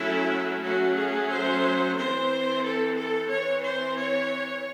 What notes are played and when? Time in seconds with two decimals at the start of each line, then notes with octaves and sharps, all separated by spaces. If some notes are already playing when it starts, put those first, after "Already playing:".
Already playing: F#3 A3 C#4 E4
0.64 F#3 A3 C#4 F#4
0.97 G#4
1.31 C5
1.96 E3 C4 C5
2.63 A4
2.96 A4
3.30 E3 C4 C#5
3.64 C5
3.97 C#5